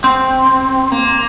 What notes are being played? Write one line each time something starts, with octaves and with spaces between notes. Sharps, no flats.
C4
A#3